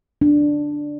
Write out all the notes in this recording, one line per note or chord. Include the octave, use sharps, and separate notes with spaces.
D4